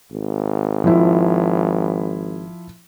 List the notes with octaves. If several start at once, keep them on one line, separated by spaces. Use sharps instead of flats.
G#1
F3 E4